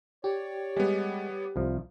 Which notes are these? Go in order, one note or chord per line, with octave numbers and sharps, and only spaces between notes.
G4 C#5 D5
G3 G#3 B3
C2 F3